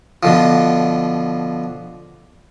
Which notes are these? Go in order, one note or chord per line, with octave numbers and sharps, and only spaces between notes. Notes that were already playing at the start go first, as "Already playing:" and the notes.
B2 D3 F3